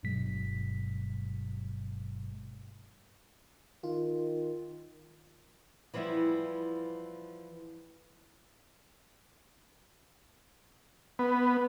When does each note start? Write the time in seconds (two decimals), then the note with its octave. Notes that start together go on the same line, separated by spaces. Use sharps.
0.03 G1 G2 B2 F#3 G#3 B6
3.84 D#3 F4
5.94 E3 F3 G3 B3 E4
11.19 B3